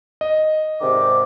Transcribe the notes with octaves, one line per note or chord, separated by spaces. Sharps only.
D#5
G#2 C3 D#3 D5